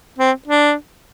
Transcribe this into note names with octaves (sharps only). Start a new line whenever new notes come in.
C4
D4